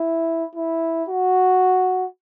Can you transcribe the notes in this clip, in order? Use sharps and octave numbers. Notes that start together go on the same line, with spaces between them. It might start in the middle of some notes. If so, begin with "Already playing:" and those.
Already playing: E4
E4
F#4